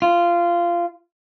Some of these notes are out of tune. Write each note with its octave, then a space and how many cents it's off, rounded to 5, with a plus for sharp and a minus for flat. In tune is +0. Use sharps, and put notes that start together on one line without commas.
F4 -15